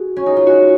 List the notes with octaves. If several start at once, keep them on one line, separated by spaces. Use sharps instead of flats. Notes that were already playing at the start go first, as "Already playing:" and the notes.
Already playing: F#4 G#4
C#4
D#4
F4
F#4